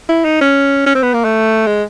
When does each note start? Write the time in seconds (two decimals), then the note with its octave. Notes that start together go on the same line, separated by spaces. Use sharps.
0.09 E4
0.25 D#4
0.41 C#4
0.86 C#4
0.95 C4
1.03 B3
1.14 A#3
1.25 A3
1.67 G#3